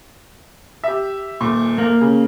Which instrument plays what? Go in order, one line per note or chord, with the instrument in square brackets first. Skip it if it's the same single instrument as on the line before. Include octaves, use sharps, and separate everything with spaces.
[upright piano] G4 E5
D#1 A#2
[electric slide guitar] A#3
[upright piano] C#3